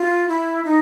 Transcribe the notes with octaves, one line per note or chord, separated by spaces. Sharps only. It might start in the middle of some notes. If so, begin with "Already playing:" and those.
Already playing: F4
E4
D#4